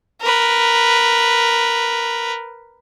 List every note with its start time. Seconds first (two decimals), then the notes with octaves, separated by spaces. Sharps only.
0.22 A#4 B4